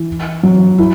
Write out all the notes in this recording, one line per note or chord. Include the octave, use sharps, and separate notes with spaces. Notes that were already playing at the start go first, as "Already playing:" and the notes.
Already playing: E3
F#3
E4